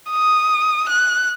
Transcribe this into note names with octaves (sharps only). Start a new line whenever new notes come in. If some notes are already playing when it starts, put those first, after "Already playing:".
D#6
F#6